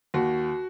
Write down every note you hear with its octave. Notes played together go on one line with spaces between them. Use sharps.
D#2 F#4